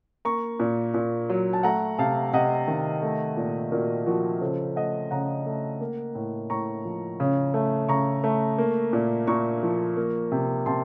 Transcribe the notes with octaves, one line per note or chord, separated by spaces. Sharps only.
A#3 A#5 C#6
A#2
A#2
F#3
A5
A3 F#5 A#5
C3 F5 A5
C3 D#5 F#5
D#3
A3
A#2
A#2 F#4 A#4
F3 F#4 A#4
C#3 A4 C5
A3 D#5 F#5
C#3 F#5 A#5
A3
A#3
A2
A2 A#5 C#6
F3
C#3
A3
C#3 A#5 C#6
A3
A#3
A#2
A#2 A#5 C#6
F3
A#3
C3
C3 A5 C6